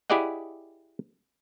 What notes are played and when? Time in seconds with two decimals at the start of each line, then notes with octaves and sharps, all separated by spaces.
0.10 E4 G4 G#4 D5 D#5 F#5